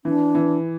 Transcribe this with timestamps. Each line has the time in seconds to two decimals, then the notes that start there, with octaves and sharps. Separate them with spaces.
0.05 E3 D4
0.35 E3